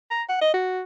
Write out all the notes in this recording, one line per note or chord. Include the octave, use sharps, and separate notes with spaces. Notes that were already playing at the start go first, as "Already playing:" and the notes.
A#5
F#5
D#5
F#4